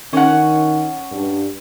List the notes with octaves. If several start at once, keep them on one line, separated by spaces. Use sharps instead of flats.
D#3 C#4 F#5
G2